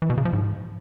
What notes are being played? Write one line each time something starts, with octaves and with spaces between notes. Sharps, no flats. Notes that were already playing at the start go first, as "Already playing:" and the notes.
E3
B2
C#3
F3
G#2